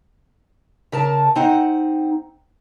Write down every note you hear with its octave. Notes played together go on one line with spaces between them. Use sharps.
C#3 A#4 A5
C4 D#4 F#5